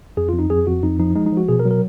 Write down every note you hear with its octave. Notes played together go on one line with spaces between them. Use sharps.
F2 G#4
F2 F4
D#4
F2 G#4
F2 F#4
F2 D#4
F3 D#4
G#3 D#4
D#4
F3
F#4
B2 G#4
A#4
F#3
A#4